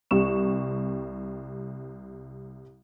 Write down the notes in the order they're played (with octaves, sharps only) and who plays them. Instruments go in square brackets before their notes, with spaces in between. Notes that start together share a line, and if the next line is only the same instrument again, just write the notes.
[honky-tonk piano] C2 C3 G4 C#6 E7